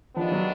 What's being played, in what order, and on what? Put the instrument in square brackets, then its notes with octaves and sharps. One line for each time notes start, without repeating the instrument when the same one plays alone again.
[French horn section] D#2 D#3 G#3 B3 D4 [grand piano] F3
[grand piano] F#3